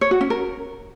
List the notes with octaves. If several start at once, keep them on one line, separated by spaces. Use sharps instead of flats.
C#5
F#4
C#4
A#4